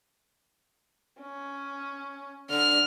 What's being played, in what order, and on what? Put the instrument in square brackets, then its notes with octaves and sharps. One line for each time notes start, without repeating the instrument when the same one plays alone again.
[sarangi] C#4
[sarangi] D3 [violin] F6